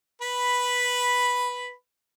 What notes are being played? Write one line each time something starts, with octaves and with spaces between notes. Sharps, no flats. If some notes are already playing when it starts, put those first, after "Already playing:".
B4 B5